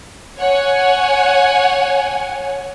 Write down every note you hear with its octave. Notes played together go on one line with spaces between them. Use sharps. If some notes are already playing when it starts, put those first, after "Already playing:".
C#5 F#5 G#5